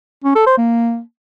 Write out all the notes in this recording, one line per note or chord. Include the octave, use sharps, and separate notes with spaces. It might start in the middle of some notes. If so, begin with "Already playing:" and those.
C#4
A4
C5
A#3